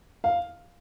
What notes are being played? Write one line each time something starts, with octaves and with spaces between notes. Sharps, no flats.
F5